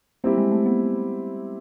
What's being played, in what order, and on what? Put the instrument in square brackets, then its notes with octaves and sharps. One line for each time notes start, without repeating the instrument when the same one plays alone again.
[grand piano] G3 C4 E4 G4 [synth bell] A#3
[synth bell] G#3
A3
B3